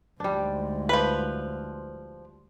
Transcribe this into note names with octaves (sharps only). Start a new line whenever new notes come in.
D2 G#2 G3 D4
F3 B4